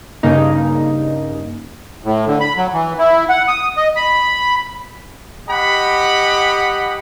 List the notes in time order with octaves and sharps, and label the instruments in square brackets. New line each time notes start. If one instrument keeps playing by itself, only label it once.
[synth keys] G2 C#3 A#3 D#4
[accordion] A2
D3
B5
F#3
E3
E4
F#5
D#6
D#5
B5
[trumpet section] G4 D#5 F#5 B5